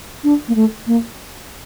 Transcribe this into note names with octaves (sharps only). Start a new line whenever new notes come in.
D4
A#3
A3
A#3